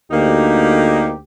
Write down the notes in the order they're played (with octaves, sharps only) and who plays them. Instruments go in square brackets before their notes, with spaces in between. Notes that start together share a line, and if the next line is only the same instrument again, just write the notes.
[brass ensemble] D2 G4 [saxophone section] A#3 D#4